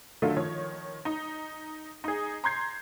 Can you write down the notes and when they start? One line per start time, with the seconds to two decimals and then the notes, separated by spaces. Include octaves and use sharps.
0.22 D3 D#3 F#3 A3 F4 A4
0.36 D#3 F3 C#5
1.05 D#4
2.04 D#4 G#4
2.44 A#5 C6 G6 G#6 C7